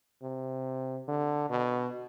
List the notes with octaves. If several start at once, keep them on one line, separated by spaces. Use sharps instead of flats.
C3
D3
B2